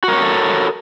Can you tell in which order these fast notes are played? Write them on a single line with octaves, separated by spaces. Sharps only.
F#4 A#4 C#5 G4 A4